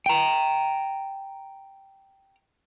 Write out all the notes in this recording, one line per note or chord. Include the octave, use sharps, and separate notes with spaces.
G5 A#5